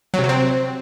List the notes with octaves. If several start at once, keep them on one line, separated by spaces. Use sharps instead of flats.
F#3
C3
F#3
C4